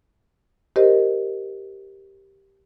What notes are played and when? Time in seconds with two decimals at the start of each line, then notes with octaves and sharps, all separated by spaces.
0.76 G4 A#4 C5 D#5